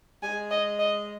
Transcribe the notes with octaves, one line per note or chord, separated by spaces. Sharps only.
G#3 G#5
D#5
D#5